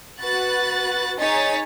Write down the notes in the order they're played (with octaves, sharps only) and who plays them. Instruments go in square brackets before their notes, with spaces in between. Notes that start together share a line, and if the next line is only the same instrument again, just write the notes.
[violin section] F#4 B4 F#6 A6
D#4 G#4 C#5 A6 B6